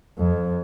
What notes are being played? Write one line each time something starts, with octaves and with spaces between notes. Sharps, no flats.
F2